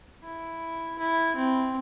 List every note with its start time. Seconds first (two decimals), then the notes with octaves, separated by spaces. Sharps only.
0.24 E4
0.99 E4
1.36 C4